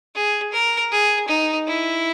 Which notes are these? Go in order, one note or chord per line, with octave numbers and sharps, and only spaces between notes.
G#4
A#4
G#4
D#4
E4